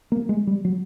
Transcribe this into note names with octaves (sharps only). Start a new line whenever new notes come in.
A#3
G#3
G3
F#3